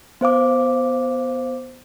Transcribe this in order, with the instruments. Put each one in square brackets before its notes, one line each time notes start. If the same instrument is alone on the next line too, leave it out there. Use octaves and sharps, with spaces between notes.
[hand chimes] B3 C5 F5 D6